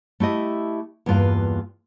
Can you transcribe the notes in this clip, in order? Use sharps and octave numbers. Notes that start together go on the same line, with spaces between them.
A3 E4 G4 D#5
E2 G2 A#3 F4 B4 F5